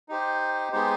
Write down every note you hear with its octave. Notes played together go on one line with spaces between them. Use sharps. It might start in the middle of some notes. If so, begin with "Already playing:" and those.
D#4 G4 C5
G#3 B3 D#4 G4 C5